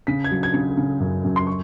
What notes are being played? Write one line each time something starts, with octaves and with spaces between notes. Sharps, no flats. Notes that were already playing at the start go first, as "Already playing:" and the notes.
C#3 B6
G#6
F#3
G#6
C#3
C#3
F#2
F#2
C6
C#6